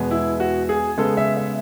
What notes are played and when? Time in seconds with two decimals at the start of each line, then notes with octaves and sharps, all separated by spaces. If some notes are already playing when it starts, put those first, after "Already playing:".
Already playing: E2 B2 G#3 B3
0.11 E4
0.40 F#4
0.69 G#4
0.97 C#3 G#3 B3 A4
1.17 E5
1.37 E5